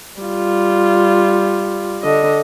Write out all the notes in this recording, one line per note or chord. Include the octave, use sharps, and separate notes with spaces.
G3 F4
D3 D#5